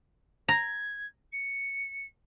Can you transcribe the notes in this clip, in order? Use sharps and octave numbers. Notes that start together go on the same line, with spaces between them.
A#5 G#6
C#7